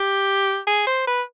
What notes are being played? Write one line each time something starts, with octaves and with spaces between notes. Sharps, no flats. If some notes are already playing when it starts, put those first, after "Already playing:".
Already playing: G4
G#4
C5
B4